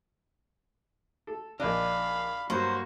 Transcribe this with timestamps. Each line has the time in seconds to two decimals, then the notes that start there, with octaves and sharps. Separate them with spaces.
1.27 A4
1.60 A#1 D4 D#5 F5 B5
2.50 G2 F#3 A#3 F#4 C5